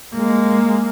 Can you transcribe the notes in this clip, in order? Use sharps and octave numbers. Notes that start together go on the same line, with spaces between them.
G#3 A#3